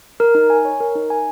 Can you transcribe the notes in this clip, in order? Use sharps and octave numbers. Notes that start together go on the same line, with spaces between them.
A#4
D#4
G#5
C#5
A#4
D#4
G#5